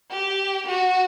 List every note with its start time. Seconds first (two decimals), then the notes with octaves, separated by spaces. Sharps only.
0.11 G4
0.67 F#4